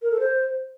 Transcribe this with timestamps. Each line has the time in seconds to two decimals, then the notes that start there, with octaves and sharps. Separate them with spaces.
0.02 A#4
0.11 A4
0.19 C5